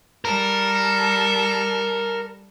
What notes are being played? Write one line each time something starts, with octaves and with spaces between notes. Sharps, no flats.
G3 A4 A#4